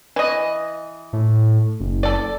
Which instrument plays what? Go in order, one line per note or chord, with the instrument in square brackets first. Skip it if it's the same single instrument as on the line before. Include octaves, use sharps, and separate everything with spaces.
[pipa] E3 D#5
[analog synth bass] A2
F#1
[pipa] A4 D5